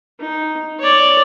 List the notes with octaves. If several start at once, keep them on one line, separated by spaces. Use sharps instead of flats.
D#4
C#5 D5